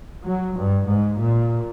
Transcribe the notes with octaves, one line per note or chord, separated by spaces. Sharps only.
F#3
G2
G#2
A#2